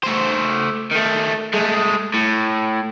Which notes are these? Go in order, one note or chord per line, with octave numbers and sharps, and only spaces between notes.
A3 C5
D#3 A3
G#3 A3
A2